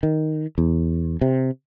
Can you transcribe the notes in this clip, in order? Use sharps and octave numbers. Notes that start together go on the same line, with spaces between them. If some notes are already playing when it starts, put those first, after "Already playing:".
D#3
E2
C3